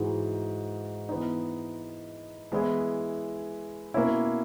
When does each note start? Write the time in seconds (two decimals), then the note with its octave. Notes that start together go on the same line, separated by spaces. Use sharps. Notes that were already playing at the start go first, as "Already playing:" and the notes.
Already playing: G#2 E3 G#3 D#4 F#4
1.09 E3 B3 D#4
2.52 E3 G#3 B3 E4 G#4
3.94 B2 A#3 C#4 E4